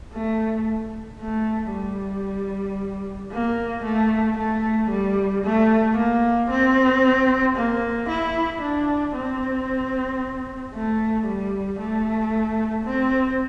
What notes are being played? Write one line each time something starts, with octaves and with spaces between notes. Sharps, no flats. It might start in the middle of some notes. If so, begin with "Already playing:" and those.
A3
A3
G3
A#3
A3
A3
G3
A3
A#3
C4
A#3
E4
D4
C4
A3
G3
A3
C4